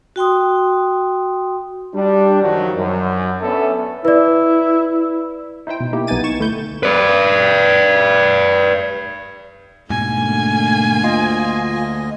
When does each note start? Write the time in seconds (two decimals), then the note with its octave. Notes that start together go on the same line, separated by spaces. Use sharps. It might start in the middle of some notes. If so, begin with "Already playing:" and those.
0.16 F#4 G5 C6 D#6
1.94 G3 D4
2.42 F#2 D#3 F3 F#3
2.77 F#2
3.41 B3 C#4 D4 A4 E5
4.05 E4 B4 D5
5.67 D#4 E4 C5 G5
5.80 B2
5.93 A#3 D#4 E4 G4
6.07 B1 B3 D#4 G#5 A6 D#7
6.24 C#6 E7
6.40 D2 A3 E4 G6
6.83 B4 D5
9.90 G#2 B2 D3 A3 A#3 G#5
11.04 D2 F4 D#5